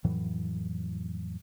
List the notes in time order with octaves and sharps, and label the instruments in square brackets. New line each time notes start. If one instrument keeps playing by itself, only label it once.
[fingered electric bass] F2 A2 E3 F#3